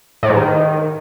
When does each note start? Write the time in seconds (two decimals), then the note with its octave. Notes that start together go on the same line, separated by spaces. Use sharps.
0.23 A2
0.30 G#2
0.36 D#3